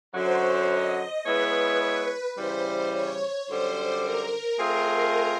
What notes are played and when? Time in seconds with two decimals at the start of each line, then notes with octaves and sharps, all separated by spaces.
0.14 F#2 D3 F#3 C5
0.70 D#5
1.25 G#3 B3 E4 G#4 B4 C#5
2.36 C#3 E3 G3 C5
2.92 C#5
3.47 F#2 D3 G3 C5
4.03 A#4
4.58 A3 C4 F4 G#4